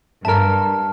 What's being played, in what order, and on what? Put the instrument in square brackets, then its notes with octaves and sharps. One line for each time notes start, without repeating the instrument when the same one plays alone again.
[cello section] G2 [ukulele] A#4 E5 [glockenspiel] A5 F6